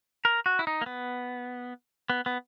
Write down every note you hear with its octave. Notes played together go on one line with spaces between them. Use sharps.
A#4
F#4
E4
D#4
A#3
B3
B3
B3